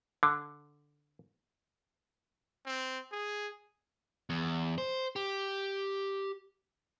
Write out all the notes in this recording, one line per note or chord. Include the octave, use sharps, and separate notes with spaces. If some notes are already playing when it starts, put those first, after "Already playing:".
D3
C4
G#4
E2
C5
G4